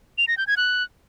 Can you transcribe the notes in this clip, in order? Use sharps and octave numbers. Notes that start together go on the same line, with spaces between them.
F7
A#6
G6
G#6
F#6